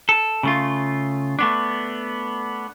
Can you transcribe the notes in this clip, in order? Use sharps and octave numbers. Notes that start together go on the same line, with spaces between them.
A4
C#3 A3 F4
A3 B3 D4